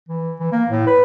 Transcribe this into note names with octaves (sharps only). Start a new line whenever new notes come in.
E3
E3
A#3
A2
B4